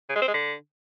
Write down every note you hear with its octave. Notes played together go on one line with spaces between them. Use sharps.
C#3
G#3
C4
G#3
D3